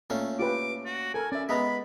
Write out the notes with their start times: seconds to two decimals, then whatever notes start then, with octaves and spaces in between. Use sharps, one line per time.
0.10 A#2 A3 C#4
0.39 F4 G4 B4 D6
0.85 F#4
1.14 A4 A#4 G#5
1.32 C#4 D5 E5
1.49 G#3 B3 E5 A#5 B5